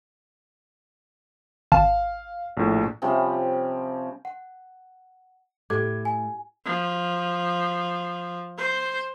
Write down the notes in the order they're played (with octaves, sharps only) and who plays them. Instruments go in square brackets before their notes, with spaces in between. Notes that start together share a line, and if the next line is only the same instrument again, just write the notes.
[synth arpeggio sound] G#1 A5 [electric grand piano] F5
[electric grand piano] A#1 A2
[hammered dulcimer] C3 F3 G3 C#4
[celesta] F#5
[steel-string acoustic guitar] A2 [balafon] G4 A4 [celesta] D6 G#6
[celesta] G#5
[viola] F3
C5